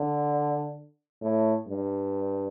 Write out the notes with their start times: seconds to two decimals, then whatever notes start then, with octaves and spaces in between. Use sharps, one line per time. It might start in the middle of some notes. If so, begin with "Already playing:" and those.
Already playing: D3
1.22 A2
1.68 G2